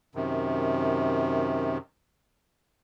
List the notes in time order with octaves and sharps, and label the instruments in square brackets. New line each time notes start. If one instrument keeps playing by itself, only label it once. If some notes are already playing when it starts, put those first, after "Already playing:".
[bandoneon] F#2 C3 D#3